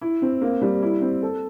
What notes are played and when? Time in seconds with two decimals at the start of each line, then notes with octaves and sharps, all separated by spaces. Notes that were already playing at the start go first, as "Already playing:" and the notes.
0.01 E4
0.22 C4
0.41 A#3
0.62 G3
0.82 E4
1.02 C4
1.23 A4